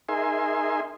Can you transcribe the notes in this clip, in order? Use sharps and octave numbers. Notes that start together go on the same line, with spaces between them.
D#4 G#4 A#4 E5 G#5 C6